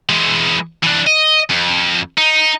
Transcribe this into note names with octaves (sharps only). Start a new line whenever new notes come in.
E3 G#3
E3 D4
D#5
F2
D#4